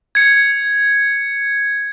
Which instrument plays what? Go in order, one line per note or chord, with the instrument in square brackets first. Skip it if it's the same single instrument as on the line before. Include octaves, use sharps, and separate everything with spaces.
[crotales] G#6 C#7